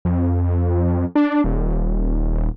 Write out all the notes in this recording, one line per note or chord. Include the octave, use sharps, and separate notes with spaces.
F2
D4
D#1